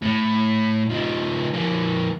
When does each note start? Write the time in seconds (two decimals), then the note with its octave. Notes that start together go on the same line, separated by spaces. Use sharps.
0.02 A2
0.89 F3 D#4
1.53 F2 A#3